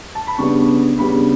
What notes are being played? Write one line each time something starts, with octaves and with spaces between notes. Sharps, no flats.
A5
B5
C#3 G3 B3 D4 C#6
C#3 G3 B3 D4 B5